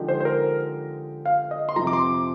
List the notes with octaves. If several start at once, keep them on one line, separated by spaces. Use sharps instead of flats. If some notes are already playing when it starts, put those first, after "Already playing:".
Already playing: D3 F3 G#3 D#4 G4
C5
C5
A#4
F5
D#5
C6
F2 C3 F3 A#5
D6
C6